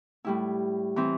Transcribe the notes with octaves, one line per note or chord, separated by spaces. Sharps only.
A2 G3 E4
E3 C4